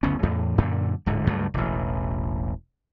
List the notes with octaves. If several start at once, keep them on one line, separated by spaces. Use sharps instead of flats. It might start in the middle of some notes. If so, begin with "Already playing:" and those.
F#1 D2 B3 C#4
E2 A2
F#2 A#2 D3
D1 G#2 D3
C#2 G2 F#3 A3
E1 A1